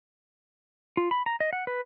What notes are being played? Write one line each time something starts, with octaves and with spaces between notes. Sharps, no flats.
F4
B5
A#5
D#5
F#5
B4